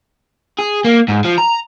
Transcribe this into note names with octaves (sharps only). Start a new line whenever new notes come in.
G#4
A#3
G#2
F3
A#5